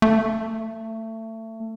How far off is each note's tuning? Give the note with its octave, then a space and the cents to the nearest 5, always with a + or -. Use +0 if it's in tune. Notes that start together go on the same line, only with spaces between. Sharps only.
A3 +25